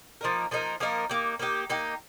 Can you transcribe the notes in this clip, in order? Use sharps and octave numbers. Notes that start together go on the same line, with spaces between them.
F3 A#3 D#4 A#4
F3 A#3 D#4 A#4
F3 A#3 D#4 A#4
A#3 D#4 G4
A#3 D#4 G4
A#3 D#4 G4